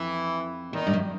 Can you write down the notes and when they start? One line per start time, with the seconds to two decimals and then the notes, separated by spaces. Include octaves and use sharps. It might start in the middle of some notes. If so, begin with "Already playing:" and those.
Already playing: F2 E3 E4
0.73 E2 D#3 D#4
0.87 G2
0.94 F#2